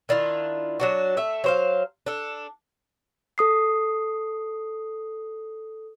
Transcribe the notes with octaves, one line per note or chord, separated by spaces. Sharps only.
D#3 D4 E4 F4
F#3 D4 F#4
A3 E5
F#3 C5 F5
D4 A4
A4 D#6 C7